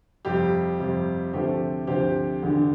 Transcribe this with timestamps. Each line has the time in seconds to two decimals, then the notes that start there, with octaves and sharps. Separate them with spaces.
0.25 F2 C3 G3 G4
0.79 F2 C3 G3
1.33 D2 C3 F3 A3 C4 G4
1.87 D2 C3 F3 A3 C4 G4
2.43 E1 D2 D3